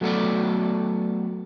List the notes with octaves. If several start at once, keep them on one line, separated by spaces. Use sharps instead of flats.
F#3 A3 B3 F#4 A4 D5